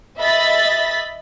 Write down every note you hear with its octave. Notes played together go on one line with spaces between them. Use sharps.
D#5 E5 B5 A6 B6